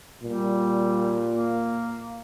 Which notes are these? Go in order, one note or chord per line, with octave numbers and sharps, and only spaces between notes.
A#2 G3
A#3